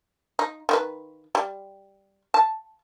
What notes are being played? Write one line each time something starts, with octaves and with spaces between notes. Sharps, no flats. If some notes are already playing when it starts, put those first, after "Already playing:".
D#4
D#3 F#4 B4
G3
A5